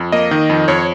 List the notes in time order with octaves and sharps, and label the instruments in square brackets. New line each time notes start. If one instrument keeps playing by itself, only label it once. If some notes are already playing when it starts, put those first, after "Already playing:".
Already playing: [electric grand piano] F2
A#3 D#5
D#3
F2
F2 C#5